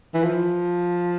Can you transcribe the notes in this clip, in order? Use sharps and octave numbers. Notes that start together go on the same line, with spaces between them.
E3
F3